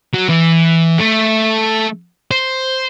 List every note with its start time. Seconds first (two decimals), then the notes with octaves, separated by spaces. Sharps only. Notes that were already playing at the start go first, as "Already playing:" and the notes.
0.13 F#3
0.29 E3
0.99 A3
2.31 C5